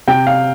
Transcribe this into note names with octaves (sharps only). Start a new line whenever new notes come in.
C3 G5
F5